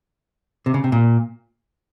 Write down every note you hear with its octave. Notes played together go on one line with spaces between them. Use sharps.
C3
C#3
C3
A#2